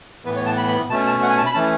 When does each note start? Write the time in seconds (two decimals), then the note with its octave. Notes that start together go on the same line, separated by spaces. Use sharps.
0.25 A2 E3 B3 B4
0.36 C#5
0.46 A5
0.57 B5
0.68 B5
0.90 B2 A3 C#4 A5
1.06 A5
1.22 F#5
1.30 G#5
1.38 A5
1.46 B5
1.54 E3 A3 C#4 A5